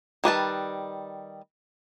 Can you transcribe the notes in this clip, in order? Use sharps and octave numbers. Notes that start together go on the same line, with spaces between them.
D#3 G3 B4 A5